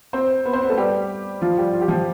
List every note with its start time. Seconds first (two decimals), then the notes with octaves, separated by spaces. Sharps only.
0.13 C4 C5
0.45 B3 B4
0.53 C4 C5
0.61 B3 B4
0.70 A3 A4
0.77 G3 G4
1.42 F3 F4
1.58 G3 G4
1.73 F4
1.81 G4
1.88 F3 F4